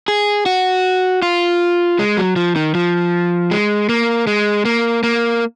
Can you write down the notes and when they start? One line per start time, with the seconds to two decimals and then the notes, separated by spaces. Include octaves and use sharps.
0.08 G#4
0.46 F#4
1.22 F4
1.99 G#3
2.17 F#3
2.36 F3
2.56 D#3
2.75 F3
3.51 G#3
3.89 A#3
4.27 G#3
4.65 A#3
5.03 A#3